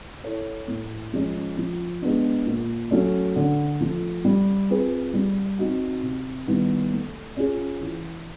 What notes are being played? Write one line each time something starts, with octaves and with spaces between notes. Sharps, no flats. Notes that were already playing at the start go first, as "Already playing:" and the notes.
E4 A4 C#5
A2
F3 G#3 C#4
F3
G#3 B3 D4
A#2
F#3 A3 C#4
D3
F3 A3
G3
C4 F4 G#4 B4
G3
C4 D#4 F#4
C3
D#3 G3 B3 E4
A3
C#4 F4 G#4
E3